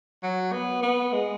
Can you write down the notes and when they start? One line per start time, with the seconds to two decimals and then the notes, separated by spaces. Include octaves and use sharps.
0.23 F#3
0.52 B3
0.83 B3
1.12 G#3